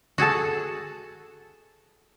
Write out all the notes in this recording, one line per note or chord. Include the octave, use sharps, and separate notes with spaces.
F#4 G#4 A4 A5